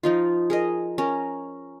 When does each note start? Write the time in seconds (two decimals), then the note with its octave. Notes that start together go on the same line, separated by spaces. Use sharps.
0.03 F3 D#4 F4
0.50 G#4 A#4 D#5
0.98 C#4 A#4